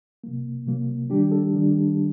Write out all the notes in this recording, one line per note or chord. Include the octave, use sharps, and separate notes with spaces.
C3 F#3 A#3
C3 F#3 A#3
D#3 G3 D4 G4
A4
D#3 G3 D4